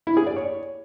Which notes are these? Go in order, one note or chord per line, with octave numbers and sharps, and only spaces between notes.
E4
G#4
D5
C#5